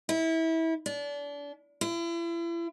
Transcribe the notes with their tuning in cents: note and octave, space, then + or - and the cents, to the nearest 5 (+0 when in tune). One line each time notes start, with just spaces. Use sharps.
E4 -25
D4 -35
E4 +40